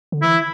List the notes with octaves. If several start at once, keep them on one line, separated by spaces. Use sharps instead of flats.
D3
E3 E4